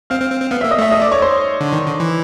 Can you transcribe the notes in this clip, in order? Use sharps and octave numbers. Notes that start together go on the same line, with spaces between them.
C4 F5 F6
C4
C4
C4
B3 F5 F6
A#3 E5 E6
D#5 D#6
A3 E5 E6
D#5 D#6
D5 D6
C#5 C#6
C5 C6
D3
D#3
D3
E3